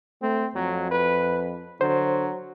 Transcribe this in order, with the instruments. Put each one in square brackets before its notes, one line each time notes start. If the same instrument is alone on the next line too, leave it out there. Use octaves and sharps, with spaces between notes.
[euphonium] A3 [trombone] C4
[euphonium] F2 [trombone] F#3
[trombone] B4
[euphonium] D3 [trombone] F#3 [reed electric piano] C5